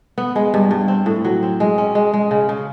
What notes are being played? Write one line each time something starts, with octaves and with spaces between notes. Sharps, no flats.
B3
G#3
G2
G2
C4
A2
F#3
C4
G#3
C#4
G#3
G#3
C#3
C#3